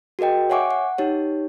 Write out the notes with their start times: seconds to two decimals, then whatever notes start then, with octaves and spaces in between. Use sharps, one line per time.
0.19 F#4 G#4 A#4 D#5 G5
0.50 C#5 E5 F#5 G#5 C#6 D6
0.71 F#5
0.98 D#4 G4 C#5